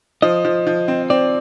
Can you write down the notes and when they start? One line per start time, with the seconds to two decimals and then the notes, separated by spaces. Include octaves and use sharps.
0.22 F3 D#5
0.45 F3
0.67 F3
0.88 C4
1.10 C4 D5